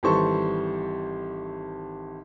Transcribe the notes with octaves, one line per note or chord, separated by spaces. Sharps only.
G#1 E3 G3 A4 C5 C#6